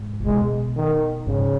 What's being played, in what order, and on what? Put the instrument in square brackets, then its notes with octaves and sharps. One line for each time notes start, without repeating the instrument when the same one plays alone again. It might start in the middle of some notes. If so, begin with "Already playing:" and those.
Already playing: [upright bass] G#2
C#3
[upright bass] B2 [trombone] G#3
[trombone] D#3
[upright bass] G#2 [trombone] C#3